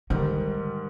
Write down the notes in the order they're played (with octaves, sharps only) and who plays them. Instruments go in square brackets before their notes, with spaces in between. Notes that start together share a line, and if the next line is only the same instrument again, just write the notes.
[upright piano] G#2 D#3 G3 [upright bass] D3